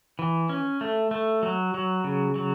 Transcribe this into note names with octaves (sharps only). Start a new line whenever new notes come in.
E3
C#4
A3
A3
F#3
F#3
C#3
F#3